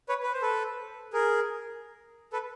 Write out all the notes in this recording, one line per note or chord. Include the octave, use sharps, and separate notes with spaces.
B4 C#5
B4
C5
A4 B4
G#4 A#4
A4 B4